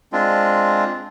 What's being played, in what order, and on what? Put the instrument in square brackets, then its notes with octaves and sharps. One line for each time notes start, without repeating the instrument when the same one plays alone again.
[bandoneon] G#3 C4 D4 F4